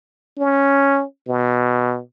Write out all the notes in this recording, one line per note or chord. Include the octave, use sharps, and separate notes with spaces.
C#4
B2